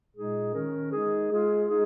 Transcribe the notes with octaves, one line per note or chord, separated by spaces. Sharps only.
A#2 G#3 D#4 G#4
D#3 C#4 A#4
G#3 D#4 G#4
G#3 F4 G#4
G#3 D#4 G#4